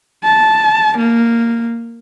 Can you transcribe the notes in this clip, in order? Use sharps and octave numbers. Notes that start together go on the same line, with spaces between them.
A5
A#3